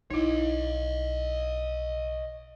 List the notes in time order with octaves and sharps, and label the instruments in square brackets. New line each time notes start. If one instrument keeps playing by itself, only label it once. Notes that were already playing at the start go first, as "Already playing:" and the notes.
[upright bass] B1 [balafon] D#4 E4 [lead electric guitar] C#5 D#5